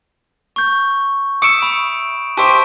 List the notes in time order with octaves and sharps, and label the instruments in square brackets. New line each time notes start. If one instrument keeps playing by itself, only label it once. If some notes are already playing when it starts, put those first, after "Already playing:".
[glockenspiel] C#6 G6
[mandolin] E5 C#6 [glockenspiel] D#6 D7 E7
[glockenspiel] B5
[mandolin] G4 C5 E5 [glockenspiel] A5 C#6 D7